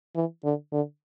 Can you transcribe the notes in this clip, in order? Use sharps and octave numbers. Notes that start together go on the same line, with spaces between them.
E3
D3
D3